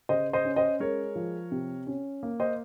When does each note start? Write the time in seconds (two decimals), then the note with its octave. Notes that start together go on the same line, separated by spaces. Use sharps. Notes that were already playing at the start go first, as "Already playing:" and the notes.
0.09 C#3 C5 D#5
0.33 C5 D#5
0.45 C#4
0.56 C5 D#5
0.80 G#3 A#4 C#5
1.15 F3
1.52 C3
1.87 C#4
2.23 A#3
2.40 C5 D#5